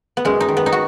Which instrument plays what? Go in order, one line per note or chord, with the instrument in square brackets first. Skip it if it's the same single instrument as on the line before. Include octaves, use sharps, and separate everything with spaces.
[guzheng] B3
F#2 G#3
D#4
D#3
B3
D#4
F#4